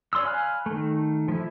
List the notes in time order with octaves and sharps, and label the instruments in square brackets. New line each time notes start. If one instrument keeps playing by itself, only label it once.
[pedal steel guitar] C#5 D5 C6 D#6 E6
F5 G#5 B5 F6 F#6
D#3 A3
F3 E4